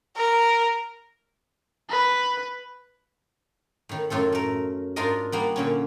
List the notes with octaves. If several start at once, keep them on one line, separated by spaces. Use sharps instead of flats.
A#4
B4
A2 D#3
F#2 A2 F4 A4
A3 A#4
G#2 D4 F4 A#4 D#5
G3 A#3 B3
A#2 D3 C#4